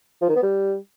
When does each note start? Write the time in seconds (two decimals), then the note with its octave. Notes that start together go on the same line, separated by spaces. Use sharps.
0.22 F3
0.29 D#3
0.36 B3
0.43 G3